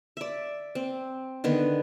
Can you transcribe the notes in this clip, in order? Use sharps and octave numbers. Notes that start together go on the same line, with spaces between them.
D5 E5
C4
D3 D#3 B3